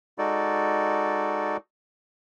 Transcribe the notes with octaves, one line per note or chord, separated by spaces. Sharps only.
G#3 D#4 F#4 A4 D5